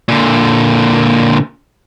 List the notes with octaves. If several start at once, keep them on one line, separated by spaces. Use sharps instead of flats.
A#2 D3